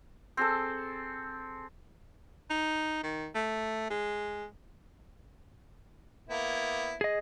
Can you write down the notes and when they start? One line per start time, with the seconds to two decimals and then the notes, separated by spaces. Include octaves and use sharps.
0.37 C4 G#4 A4
2.50 D#4
3.03 D#3
3.35 A3
3.90 G#3
6.29 A#3 B3 E4
7.01 G#4 D#5